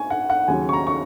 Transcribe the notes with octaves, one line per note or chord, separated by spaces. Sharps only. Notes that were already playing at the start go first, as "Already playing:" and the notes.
Already playing: G#5 C#6
F#5
F#5
D#2 C#3 F#3 G#5
C#6
A#5
C#6